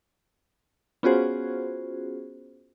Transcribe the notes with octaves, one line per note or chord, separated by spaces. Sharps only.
B3 C#4 F4 F#4 G#4 C5